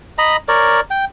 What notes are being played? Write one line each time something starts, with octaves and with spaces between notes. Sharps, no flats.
D#5 A#5 B5
A#4 C#5 D5
G5